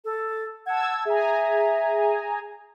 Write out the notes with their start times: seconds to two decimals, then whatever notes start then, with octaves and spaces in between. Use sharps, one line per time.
0.05 A4
0.66 F#5 A5 E6 G#6
1.05 G#4 E5 G#5 A#5